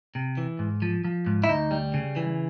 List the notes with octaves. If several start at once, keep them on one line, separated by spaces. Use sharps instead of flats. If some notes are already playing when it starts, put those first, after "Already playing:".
C3
E3
G#2
F3
F3
G#2
E4
D2 D#4
G3
C#3
E3